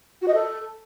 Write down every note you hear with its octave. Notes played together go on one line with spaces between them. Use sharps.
F#4
D#5
A4